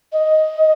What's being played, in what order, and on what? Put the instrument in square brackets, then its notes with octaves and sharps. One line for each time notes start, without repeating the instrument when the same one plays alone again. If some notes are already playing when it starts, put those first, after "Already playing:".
[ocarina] D#5